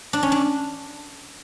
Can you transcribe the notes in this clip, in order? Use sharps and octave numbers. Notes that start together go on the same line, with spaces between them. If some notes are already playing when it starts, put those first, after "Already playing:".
D4
C#4
D4